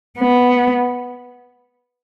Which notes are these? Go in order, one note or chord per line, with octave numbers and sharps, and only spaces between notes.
B3